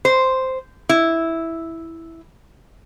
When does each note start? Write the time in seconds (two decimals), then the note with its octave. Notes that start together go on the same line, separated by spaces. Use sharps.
0.05 C5
0.89 E4